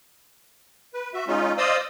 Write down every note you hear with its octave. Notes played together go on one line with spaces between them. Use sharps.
B4
F#4 E5
G#3 C#4 D#4 F4
C5 D5 D#5 F5 D#6 E6